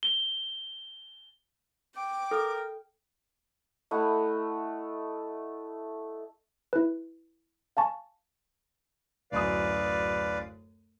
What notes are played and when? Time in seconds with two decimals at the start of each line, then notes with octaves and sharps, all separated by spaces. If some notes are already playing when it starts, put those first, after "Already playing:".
0.03 G7
1.96 G5 D6
2.31 A4 A#4
3.91 A3 E4 D#5 F#5
6.73 E4 B4
7.77 F5 G#5 A5 C#6
9.32 D1 F#2 B4 D5 F5 D#6